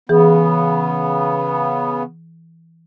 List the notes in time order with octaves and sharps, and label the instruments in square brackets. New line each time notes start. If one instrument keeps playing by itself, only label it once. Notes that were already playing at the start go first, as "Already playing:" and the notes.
[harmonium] C#3 B3 [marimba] E3 G#4